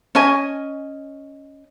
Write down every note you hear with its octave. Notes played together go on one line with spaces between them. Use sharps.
C#4 D#5 G#5